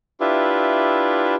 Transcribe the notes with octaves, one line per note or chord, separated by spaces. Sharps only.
D4 E4 F4 G4 B4 E5